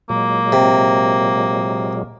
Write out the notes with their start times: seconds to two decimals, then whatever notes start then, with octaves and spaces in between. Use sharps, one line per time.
0.10 A#2 F#3 G#3 A#3
0.52 C3